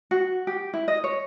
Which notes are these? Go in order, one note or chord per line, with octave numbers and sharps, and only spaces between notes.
F#4
G4
E4
D#5
C#5